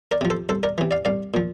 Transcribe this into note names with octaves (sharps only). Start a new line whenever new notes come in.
A#4 D5
C3 F3
A4 C5
C2 A4 C5
A#4 D5
C3 E3
D5 F5
C2 D5 F5
A#2 F3